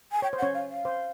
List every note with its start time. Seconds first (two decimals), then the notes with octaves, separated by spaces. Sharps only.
0.12 G#5
0.22 C#5 G5
0.33 C5
0.38 F#5
0.42 C#4 C#5
0.54 F5
0.70 F5
0.85 C5